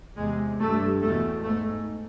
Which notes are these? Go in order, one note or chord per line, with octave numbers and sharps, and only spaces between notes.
E2 C3 G#3
G2 A3
E2 B2 A3
G#2 A3